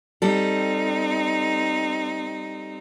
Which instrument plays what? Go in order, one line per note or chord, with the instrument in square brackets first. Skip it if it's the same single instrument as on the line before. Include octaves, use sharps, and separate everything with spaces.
[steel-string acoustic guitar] G3 A4 [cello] C4 D#4